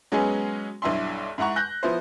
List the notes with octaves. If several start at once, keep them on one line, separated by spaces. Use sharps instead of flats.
F#3 G#3 B3 C#4 G#4
B1 G2 E4 E5 C6
G#2 E4 F#5 A#5 C#6
F#6 G6 A#6
F3 B3 E4 C5